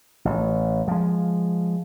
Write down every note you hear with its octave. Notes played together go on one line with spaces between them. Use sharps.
A1
F3 G#3